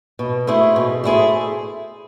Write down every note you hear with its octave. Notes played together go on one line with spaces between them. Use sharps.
B2
A3 E4 G#4 C5
B2
A3 E4 G#4 C5